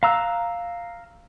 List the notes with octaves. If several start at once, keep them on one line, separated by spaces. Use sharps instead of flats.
F5 A#5 E6 F#6